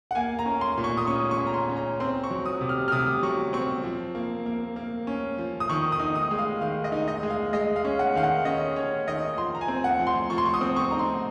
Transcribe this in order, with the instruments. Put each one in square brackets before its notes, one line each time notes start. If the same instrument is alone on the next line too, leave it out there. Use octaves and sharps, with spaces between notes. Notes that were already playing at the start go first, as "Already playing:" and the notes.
[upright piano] F#5
A#3 G#5
A#5
C#4
C6
A#2
C#6
D#6
C#4 C#6
C#6
C#4
A#5
C6
C#4
A#5
C4 C6
C#6
F#3
D#6
C3
F6
F6
C3 D#6
F#3 C#6
C4 C#6
F3
A#3
A#3
A#3
C#4
F3
D#6
D#3 C#6
D#6
D#4
D#6
G#3
F5
D#3 F5
D#5
D#4
D#5
G#3
F5
G#3 D#5
F5
C#4
F#5
D#3 F5
F#5
C#4 D#5
C#4 C#5
D#3 D#5
F3 C6
A#5
G#5
C4
F#5
F3
C6
F3 C#6
C6
C#6
D#6
C4
C#6
D#4 A#5
C6